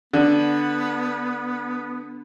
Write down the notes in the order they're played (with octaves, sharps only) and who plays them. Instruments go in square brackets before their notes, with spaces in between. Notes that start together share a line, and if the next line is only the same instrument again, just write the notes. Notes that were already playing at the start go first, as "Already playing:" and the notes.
[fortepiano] D3 [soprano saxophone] B3